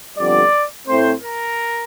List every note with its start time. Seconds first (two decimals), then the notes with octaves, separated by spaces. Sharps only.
0.17 G1 F2 D3 G3 D5
0.87 A2 A3 C4 C5
1.22 A#4